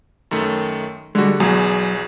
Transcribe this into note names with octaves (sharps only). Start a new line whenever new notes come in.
F#2 D#3 A3
D3 G3 G#3 F#4
B1 E2 F#3 G#4